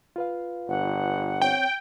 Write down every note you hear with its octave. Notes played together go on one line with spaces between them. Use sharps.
F4 B4 F5
G1 F#5
C4 C#5 G5